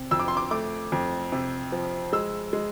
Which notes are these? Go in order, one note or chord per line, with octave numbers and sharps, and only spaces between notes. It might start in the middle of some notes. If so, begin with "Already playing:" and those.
Already playing: C3
F2 E6
D6
C6
D6
A3 D6
F2
C3
F3
G#3 E6
G#3